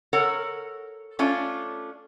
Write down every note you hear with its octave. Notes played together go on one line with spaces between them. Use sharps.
A4 A#4 C#5 F#5
A3 C#4 D4 F4